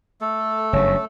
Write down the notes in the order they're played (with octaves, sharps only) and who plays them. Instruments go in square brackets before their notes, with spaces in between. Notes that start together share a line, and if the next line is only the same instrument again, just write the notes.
[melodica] A3 A4
[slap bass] F#1 G2 [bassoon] C#4